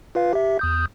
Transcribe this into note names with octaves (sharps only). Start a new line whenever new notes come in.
F4 B4 F5
G4 E5
E2 D#6 G6